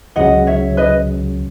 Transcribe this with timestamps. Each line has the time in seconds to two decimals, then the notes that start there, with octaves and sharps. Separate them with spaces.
0.16 C#2 C#3 F#3 C#4 D#5 F#5
0.47 C#5 E5
0.77 B4 D#5